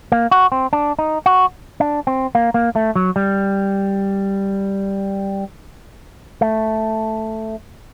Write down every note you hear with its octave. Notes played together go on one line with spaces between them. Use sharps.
A#3
F#4
C4
D4
D#4
F#4
D4
C4
A#3
A#3
A3
F#3
G3
A3